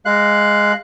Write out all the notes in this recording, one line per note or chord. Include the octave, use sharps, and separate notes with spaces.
G#3 F5 F#6